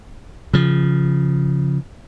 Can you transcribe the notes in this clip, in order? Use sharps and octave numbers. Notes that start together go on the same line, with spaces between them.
C#3 F3